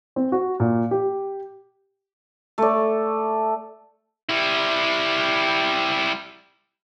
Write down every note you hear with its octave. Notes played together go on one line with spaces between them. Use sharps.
C4
F#4
A#2
G4
A3 D5
G3 E4